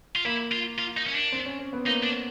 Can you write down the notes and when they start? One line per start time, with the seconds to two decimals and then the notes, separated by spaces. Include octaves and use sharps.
0.16 F4
0.25 A#3 E4
0.52 F4
0.79 F4
0.97 D#4
1.06 C#4
1.15 D4
1.32 C4
1.46 C#4
1.59 C#4
1.73 B3
1.86 A#3 D#4
2.03 D4